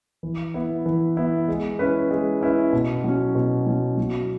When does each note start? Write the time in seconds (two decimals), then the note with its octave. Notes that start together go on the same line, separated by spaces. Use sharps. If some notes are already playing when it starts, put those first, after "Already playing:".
0.23 E3
0.54 B3 E4
0.86 E3
1.17 B3 E4
1.48 G#3
1.79 C#4 E4 B4
2.11 G#3
2.41 C#4 E4 B4
2.73 B2
3.04 F#3 C#4
3.35 B2
3.67 F#3 C#4
3.98 F#3